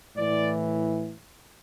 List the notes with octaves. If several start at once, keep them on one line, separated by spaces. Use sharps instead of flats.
A2 E3 D5